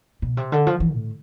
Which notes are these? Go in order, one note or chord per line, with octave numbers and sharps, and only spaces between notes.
B2
C3
D3
F3
E3
A2